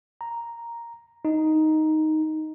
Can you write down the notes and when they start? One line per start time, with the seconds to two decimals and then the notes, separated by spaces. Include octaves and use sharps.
0.21 A#5
1.25 D#4